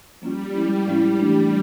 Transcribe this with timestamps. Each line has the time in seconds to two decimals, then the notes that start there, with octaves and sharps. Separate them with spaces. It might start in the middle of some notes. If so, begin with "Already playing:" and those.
0.22 F3 G3 A#3 C#4 F4
0.54 F3 G#3 C#4 E4
0.86 A2 F3 G#3 C#4 E4
1.19 E3 A3 D4 G4